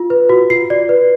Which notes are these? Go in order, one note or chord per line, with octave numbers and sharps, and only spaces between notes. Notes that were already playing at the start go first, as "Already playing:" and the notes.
Already playing: F4
B4
F#4
F4 C7
D5
B4